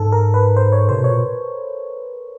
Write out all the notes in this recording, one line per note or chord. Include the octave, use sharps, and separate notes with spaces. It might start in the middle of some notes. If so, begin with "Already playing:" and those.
Already playing: G#2 A4
A#4
B4
C5
C#5
C3 C5
B2 C#5
A#2